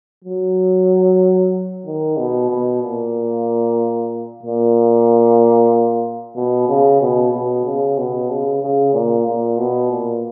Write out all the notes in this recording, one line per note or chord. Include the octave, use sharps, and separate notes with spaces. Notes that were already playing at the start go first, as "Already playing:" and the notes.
F#3
D#3
B2
B2
A#2
A#2
B2
C#3
B2
B2
C#3
B2
C#3
C#3
A#2
A#2
B2
A#2